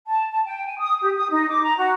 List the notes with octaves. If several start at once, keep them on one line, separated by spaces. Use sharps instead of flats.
A5
A5
G5
G#5
D#6
G4
D#6
D#4
D6
A#5
F#4